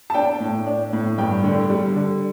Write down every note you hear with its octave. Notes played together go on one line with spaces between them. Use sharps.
A5
D4 G5
A2
D4
A2
G2 G5
D3
G3
D3